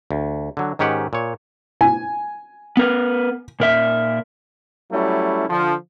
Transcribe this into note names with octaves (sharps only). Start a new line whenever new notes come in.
D2
D3 F#3
G#2 D#3 C#4 G4 F#5
A#2 C#5
G#5
B3 A#4 B4
A#2 A#4 E5
F#3 G3 A3 C#4 E4
D3 F3